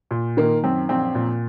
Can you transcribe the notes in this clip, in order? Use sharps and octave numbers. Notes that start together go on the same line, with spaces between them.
A#2
D#3 A#3
F#2 C4
A#1 C4
A#2